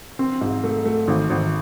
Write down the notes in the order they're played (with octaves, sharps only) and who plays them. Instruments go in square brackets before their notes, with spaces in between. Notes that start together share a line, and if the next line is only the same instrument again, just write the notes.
[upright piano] C4
G#2
A3
A3
G#1
G#1